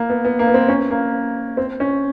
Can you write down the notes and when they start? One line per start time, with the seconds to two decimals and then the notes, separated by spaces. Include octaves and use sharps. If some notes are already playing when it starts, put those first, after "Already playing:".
Already playing: A#3
0.10 B3
0.25 B3
0.39 A#3
0.47 B3
0.54 C4
0.68 C#4
0.91 A#3
1.57 C4
1.80 C#4